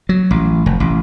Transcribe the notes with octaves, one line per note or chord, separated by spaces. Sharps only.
F#3
A1
F1
A1